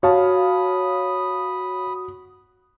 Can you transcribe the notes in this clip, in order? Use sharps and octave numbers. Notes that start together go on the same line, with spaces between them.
F#4 C#5 F5 A5 B5 D#6